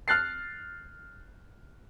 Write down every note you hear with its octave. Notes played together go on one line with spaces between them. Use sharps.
F6 F#6 A6 C7